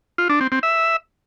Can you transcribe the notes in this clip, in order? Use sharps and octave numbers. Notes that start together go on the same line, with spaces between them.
F4
D4
C4
C4
E5